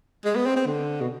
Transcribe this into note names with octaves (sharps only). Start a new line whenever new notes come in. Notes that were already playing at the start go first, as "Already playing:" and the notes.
G#3
B3
C4
C4
D3
B2